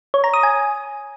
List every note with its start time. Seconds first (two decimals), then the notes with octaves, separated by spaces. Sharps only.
0.14 C#5
0.24 A#5
0.34 D#6
0.43 G#5